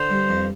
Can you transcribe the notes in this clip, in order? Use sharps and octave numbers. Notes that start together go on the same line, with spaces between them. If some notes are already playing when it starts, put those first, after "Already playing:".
Already playing: D3 C5
G2
F2